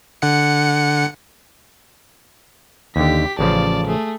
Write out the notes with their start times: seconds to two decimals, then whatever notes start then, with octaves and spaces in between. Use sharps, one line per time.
0.22 D3 F#5 C#7
2.96 D#2 D3 G4 B6
3.39 A1 C#3 F3 D5 A5
3.87 A3 G#4